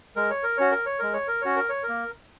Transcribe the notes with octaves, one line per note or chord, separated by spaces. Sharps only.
G#3 A#4
C#5
A#4
C#4 F#4 C#5
A#4
C#5
G#3 A#4
C#5
A#4
C#4 F#4 C#5
A#4
C#5
A#4
A#3